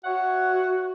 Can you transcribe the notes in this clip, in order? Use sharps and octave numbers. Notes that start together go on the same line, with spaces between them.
F#4 C#5 E5 F#5